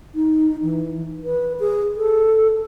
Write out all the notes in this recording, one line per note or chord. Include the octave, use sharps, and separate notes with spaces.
D#4
E3
B4
G#4
A4